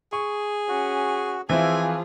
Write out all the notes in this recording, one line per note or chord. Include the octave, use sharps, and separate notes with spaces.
G#4 C#6
C#4 F#4
E3 F3 C4 E4 F4 G#4 G#5